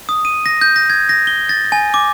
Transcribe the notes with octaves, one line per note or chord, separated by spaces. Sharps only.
D#6
D#7
A#6
G6
A#6
G#6
A#6
G7
A6
G#5
D6